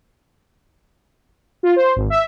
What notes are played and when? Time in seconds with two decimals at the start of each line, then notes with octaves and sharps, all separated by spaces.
1.63 F4
1.76 C5
1.96 G#1
2.10 E5